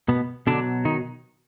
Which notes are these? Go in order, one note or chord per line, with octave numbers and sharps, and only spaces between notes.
B2 B3
B2 D3 F#3 D4
D#3 D#4